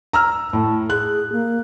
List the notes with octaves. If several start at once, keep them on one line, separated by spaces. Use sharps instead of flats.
A#5 E6 F6
A2 A5
G#4 F#6
A#3